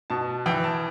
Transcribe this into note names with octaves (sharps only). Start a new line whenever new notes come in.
B2 A5
E3 G5
A5